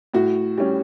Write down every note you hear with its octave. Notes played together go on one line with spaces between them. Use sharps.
A2 F#4
G3 C#4